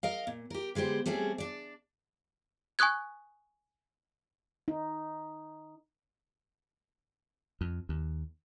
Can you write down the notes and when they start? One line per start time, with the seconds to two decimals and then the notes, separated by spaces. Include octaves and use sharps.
0.03 A#4 D#5 F5
0.27 A#2
0.50 G4 A#4
0.75 D3 G#3 B3 G4 C5
1.06 G3 A3 C4 C#4 G#4
1.38 D4 D5
2.79 G#5 C#6 D#6 F#6 G#6
4.68 D#4
7.61 F2
7.89 D#2